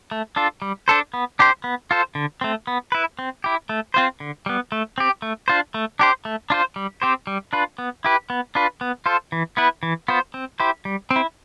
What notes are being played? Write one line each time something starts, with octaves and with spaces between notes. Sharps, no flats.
A3
D4 F4 A4
G3
D4 A4 C5
B3
D4 G4 C5
B3
F4 A4 C5
D3
A3 C4
B3
E4 B4
C4
E4 G4
A3
C4 F4 C5
D3
G3 B3
A3
C4 G4
A3
D4 F4 C5
A3
D4 G4 C5
A3
D4 F4 C5
G3
C4 G4 C5
G3
D4 F4 B4
B3
E4 G4 B4
B3
D4 F4 B4
B3
F4 A4 C5
E3
B3 E4 B4
E3
B3 F4 C5
C4
E4 G4 C5
G3
C4
E4